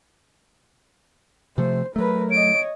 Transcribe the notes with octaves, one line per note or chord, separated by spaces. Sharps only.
C3 F3 A3 C5
F#3 A3 A#4 B4
C#5 D#5 D7